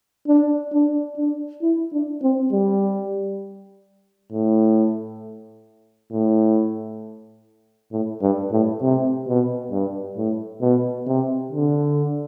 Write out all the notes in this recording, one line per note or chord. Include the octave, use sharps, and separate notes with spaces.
D4
D4
D4
E4
D4
C4
G3
A2
A2
A2
G2
A2
C3
B2
G2
A2
B2
C3
D3